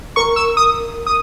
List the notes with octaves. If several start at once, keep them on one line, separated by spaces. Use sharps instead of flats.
A#4 C#6
E6
D#6
D#6